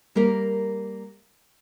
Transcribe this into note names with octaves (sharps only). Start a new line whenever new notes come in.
G3 A#3 G4 A#4